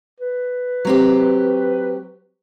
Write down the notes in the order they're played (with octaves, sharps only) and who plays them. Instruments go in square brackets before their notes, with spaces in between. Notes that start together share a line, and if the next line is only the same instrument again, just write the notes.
[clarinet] B4
[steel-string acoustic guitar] F#3 C4 G4